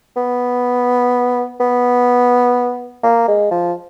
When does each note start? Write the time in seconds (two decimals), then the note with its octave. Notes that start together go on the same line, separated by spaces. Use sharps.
0.16 B3
1.60 B3
3.03 A#3
3.27 G#3
3.51 F3